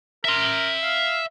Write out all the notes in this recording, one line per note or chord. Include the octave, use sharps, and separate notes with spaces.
A#4 E5 C6
F5